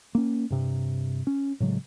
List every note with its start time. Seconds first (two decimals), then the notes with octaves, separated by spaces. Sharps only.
0.15 A#3 C#4
0.50 G2 C3
1.27 C#4
1.60 A2 C#3 F#3 G#3